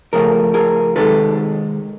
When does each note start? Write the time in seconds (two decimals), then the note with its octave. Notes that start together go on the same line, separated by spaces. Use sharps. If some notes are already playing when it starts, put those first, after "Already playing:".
0.13 C#3 F3 A3 G#4 A#4
0.54 G#4 A#4
0.96 C3 D#3 G#3 A4 B4